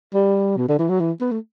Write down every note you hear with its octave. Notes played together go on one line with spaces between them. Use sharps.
G3
B2
D3
E3
F#3
E3
B3
A3